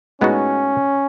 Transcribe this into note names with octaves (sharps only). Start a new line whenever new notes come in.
A2 G#3 B3 C#4 D#4 F#4